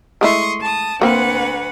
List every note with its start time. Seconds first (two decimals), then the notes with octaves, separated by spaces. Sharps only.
0.21 G#3 A3 E4 C6 C#6 D#6
0.61 A5 D#6
1.01 D2 A#3 C4 B4 F#5